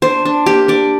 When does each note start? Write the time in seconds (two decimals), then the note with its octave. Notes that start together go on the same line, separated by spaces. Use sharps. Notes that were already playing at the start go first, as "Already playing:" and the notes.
0.02 D4 C5
0.25 D4
0.46 A#3 G4
0.68 D4 D5